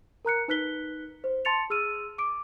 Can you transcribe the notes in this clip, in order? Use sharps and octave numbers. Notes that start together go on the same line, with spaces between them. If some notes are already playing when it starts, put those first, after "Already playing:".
A#4 A#5 F#6 C#7
D#4 B4 F#6 B6 G7
C5
A5 C6 A6 C#7 F7
G#4 E6 F6 D#7
D6 D7